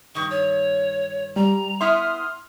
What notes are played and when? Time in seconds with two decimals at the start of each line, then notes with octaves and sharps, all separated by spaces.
0.15 G2 D#3 C#6
0.30 C#5
1.36 G3 A#5
1.81 B3 E4 E5 C6 D#6 F6